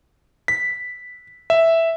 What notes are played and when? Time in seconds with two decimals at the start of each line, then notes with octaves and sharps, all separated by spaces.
0.48 B6
1.50 E5